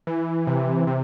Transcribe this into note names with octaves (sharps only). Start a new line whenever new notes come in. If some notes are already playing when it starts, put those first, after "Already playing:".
E3
C3
C3